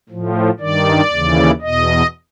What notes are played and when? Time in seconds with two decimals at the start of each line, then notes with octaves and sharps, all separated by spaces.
0.09 A2 F3
0.60 G2 D#3 D5
1.11 D#2 C#3 E3
1.61 E2 B2 D#5